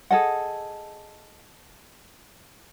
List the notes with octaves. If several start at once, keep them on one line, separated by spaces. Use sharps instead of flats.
G#4 A4 D#5 F#5